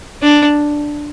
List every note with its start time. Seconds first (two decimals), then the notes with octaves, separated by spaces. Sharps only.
0.23 D4